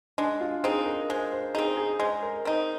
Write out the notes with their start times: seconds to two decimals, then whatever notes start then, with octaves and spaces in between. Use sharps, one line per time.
0.18 G#3 D4
0.41 F4
0.64 C4 D#4 G#4
0.86 A#4
1.10 G#3 C5
1.32 C5
1.55 D#4 G#4
1.58 C4
1.77 G#4
2.00 G#3 C5
2.23 A#4
2.45 C4 D#4 C5